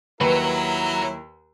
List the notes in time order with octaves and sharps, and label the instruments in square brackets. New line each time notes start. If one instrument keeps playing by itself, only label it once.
[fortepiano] D#2 [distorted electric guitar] F#3 [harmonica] E4 A#4 [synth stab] B4